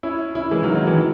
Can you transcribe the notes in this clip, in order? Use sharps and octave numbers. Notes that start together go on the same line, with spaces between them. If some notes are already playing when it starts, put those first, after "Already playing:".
C#4 E4
C#4 E4
E3 G#3
D#3 F#3
D#3 F#3
E3 G#3